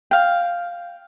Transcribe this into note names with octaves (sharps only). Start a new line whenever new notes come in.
F5 G5